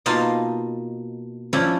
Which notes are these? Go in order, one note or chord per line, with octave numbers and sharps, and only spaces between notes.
B2 A#3 D#4 F4 A5
F3 C#4 D4 E4